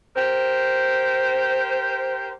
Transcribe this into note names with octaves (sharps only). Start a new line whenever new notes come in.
G4 A#4 C5